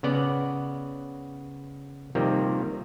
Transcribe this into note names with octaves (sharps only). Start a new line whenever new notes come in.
C#3 B3 D5 F#5
C3 D#3 F3 G3 A#3